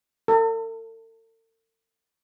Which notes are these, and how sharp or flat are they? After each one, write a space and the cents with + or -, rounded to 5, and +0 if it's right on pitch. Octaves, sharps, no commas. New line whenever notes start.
A4 +45